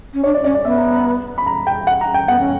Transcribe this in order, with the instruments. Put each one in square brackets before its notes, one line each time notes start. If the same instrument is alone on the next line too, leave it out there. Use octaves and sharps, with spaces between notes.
[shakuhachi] C#4
[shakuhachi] D4 [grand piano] C#5
[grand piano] D5
[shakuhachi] C#4 [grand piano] D5
[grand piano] D5
[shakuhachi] B3 [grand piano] E5
[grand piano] A#5
A#5
B5
A#5
G5
F#5
A#5
G5
[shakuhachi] B3 [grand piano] F#5
[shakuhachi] C#4